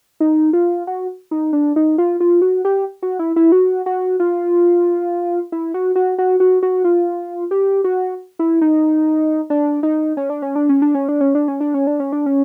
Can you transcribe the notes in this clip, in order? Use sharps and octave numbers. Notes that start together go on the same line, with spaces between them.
D#4
F4
F#4
D#4
D4
D#4
F4
F4
F#4
G4
F#4
E4
E4
F#4
F#4
F4
E4
F#4
F#4
F#4
F#4
F#4
F4
G4
F#4
E4
D#4
D4
D#4
C#4
D4
C#4
D4
C#4
D4
C#4
D4
C#4
D4
C#4
D4
C#4
D4
C#4
D4
C#4